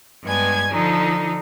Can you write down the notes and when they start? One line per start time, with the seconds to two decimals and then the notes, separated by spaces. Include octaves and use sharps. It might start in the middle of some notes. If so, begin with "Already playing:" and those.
0.24 G2 G#3 B3 G#5 G#6
0.70 D3 F3 D#4